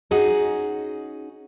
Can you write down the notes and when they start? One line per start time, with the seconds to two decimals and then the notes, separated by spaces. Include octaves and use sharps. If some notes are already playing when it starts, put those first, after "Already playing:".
0.11 C#4 D#4 F#4 G#4